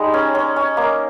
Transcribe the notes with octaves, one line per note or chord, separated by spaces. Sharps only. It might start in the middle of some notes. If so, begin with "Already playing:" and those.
Already playing: G3 G#3 D#4
C#4
C#4
C#4
A#3